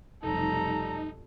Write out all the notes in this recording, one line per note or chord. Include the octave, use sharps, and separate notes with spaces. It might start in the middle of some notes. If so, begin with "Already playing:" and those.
F1 B1 G3 D#4 A4 A#5